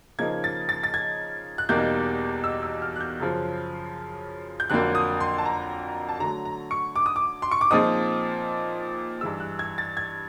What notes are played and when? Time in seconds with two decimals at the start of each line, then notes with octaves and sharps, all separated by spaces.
0.19 C#3 F3 A#3 D#4 G#6
0.44 A6
0.69 A6
0.83 A6
0.94 G#6
1.58 F#6
1.69 E2 B2 G3 A#3 D#4 G6
2.44 E6
2.63 E6
2.82 F6
2.96 F#6
3.01 G6
3.20 F#2 C#3 F3
4.60 G6
4.70 F2 D3 F#3 A#3 F#6
4.95 D#6
5.20 C6
5.38 A5
5.46 A#5
6.09 A5
6.20 D3 F#3 A3 A#5
6.45 A#5
6.71 C#6
6.96 D6
7.06 D#6
7.16 D6
7.42 C6
7.51 C#6
7.61 D6
7.70 A#2 F3 G#3 C4 D#4 D#6
9.21 G2 E3 G#3 E6
9.40 F#6
9.59 G#6
9.78 A6
9.97 G#6